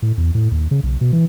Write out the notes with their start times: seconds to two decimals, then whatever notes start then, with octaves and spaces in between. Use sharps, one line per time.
0.02 A2
0.17 E2
0.35 A2
0.51 D#2
0.71 C#3
0.83 B1
1.01 B2
1.13 E3